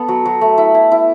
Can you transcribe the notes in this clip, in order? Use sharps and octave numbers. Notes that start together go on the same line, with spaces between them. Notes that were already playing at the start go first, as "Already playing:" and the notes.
Already playing: B3 A4
F#3
F#3
A3
E4
E4
E4